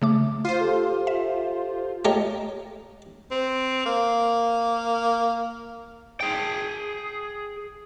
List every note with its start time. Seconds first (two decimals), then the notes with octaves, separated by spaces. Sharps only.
0.02 C#3 A3 D6
0.45 F4 C5 C7 D#7
0.60 G4 A4
1.07 E5
2.05 A3 F4 G4 A#4 C#5 D#5
3.31 C4
3.86 A#3
6.21 G#4 G5